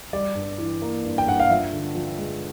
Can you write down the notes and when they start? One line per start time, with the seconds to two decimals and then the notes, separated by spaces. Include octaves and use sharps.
0.13 G3 D5
0.35 G2
0.58 E3
0.82 A#3
1.05 G2
1.18 G5
1.26 G2 F#5
1.40 F5
1.50 F3 E5
1.73 D3
1.95 F3
2.18 G#3